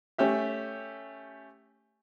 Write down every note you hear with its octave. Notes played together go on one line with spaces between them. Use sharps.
A3 C#4 G4 E5